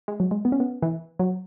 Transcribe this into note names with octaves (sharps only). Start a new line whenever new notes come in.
G#3
F#3
G#3
B3
C#4
B3
E3
F#3